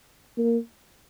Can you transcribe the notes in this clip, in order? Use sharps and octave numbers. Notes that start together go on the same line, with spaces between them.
A#3